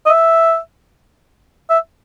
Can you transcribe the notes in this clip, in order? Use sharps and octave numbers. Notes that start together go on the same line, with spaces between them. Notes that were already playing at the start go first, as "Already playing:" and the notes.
D#5
E5
E5